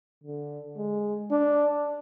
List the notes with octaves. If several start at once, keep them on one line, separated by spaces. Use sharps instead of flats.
D3
G#3
D4